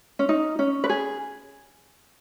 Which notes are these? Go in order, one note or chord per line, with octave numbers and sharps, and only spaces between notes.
C#4
D#4
C#4
B4
G#4